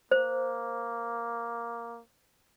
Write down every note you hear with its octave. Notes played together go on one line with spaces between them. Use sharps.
A#3 C5